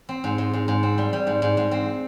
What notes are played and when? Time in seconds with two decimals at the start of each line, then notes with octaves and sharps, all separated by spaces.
0.09 C4
0.24 G#2
0.38 G#2
0.53 G#2
0.68 G#2
0.83 C4
0.98 G3
1.13 G3
1.27 G#2
1.42 G#2
1.57 G#2
1.71 C4